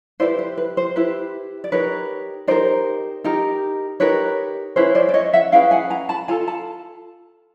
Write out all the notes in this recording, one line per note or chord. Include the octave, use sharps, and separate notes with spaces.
E4 G4 B4 C5 D5
C5
B4
C5
E4 G4 B4 C5
D5
D#4 G4 A#4 B4 C#5
D#4 G4 A#4 C5 D5
D#4 G4 A#4
D#4 G4 A#4 B4 C#5
C#4 E4 G#4 B4 C5
C5 D5
D5
C#5 D#5
E5 F#5
C#4 E4 G#4 B4 F5 G5
F#5 G#5
G#5 A#5
A5 B5
F4 A4 G#5 A#5
A5 B5